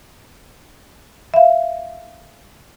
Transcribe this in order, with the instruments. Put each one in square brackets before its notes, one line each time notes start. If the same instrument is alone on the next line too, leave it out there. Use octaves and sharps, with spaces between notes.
[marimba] E5 F5